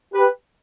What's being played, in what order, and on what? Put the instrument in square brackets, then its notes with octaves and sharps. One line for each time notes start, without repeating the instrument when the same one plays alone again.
[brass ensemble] G4 B4